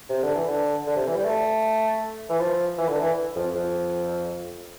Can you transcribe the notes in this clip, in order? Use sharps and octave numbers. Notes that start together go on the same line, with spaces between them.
C3
D3
E3
D3
D3
C3
E3
G3
A3
E3
F3
E3
D3
E3
F2
F2